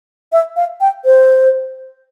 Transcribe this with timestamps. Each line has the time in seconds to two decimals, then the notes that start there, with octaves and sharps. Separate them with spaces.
0.32 E5
0.56 F5
0.81 G5
1.05 C5